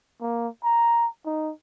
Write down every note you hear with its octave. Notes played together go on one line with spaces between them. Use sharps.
A#3
A#5
D#4